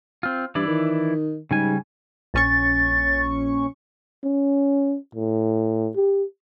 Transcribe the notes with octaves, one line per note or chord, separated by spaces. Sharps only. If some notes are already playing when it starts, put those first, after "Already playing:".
C4 F4
G2 E3 E4 D5
D#3
G#2 C#3 G3 G#5
A#1 C#4 C#6 A6
C#4
A2
G4